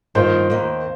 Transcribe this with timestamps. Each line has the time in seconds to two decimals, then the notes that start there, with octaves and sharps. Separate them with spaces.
0.15 G2 D#3 A#3 F4 C5
0.50 D#2 D#3 A#3